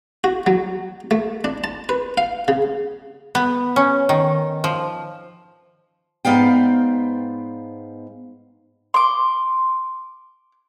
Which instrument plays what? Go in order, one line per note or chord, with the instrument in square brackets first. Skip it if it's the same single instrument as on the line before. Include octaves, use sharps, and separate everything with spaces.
[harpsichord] F#4
F#3
A3
D4
A5
B4
F5
C#3
[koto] B3
C#4
D#3
F3
[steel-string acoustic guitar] G#2 B3 D5 F5 G5
[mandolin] C6 D6